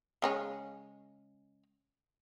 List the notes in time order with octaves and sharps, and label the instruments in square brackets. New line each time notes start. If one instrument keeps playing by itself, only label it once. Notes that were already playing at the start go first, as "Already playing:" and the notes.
[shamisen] C#3 G#3 C#4